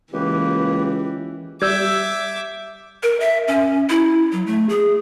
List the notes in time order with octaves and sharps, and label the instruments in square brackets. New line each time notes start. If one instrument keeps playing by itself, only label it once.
[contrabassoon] C#2 [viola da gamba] E3 [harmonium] A#3 G4 B4
[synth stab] G3 [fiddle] E5 D6 [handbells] E6 G6 G#6
[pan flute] A#4
E5
C#4
E4
F#3
A3
G#4